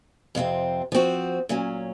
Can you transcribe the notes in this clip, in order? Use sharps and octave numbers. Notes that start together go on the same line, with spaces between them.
F2 C3 F3 C4
F3 C4 F#4
A#2 F#3 C#4